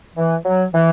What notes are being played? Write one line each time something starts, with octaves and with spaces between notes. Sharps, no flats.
E3
F#3
E3